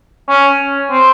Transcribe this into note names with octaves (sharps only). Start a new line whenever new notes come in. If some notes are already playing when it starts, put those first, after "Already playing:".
C#4
C4